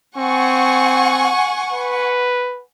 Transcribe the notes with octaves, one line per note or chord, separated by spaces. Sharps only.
C4 F#5 G#5 C#6
B4